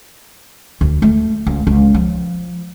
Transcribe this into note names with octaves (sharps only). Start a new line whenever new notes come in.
D2
A3
C#2
C#2
F3